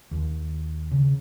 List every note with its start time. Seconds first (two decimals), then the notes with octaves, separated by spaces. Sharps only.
0.11 D#2
0.91 C#3